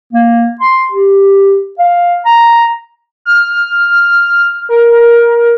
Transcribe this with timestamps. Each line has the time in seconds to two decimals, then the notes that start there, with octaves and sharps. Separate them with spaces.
0.13 A#3
0.61 C6
0.92 G4
1.79 F5
2.25 A#5
3.25 F6
4.69 A#4